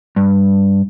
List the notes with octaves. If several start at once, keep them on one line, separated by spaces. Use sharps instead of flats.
G2